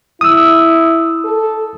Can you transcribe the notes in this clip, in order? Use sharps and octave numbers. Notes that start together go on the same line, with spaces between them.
E4 D#6 E6
A4